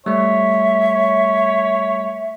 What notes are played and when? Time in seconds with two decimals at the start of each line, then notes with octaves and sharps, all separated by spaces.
0.06 G3 A3 C#5 E5
0.95 C#5